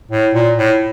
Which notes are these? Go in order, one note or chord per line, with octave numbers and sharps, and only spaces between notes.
A2
A#2
A2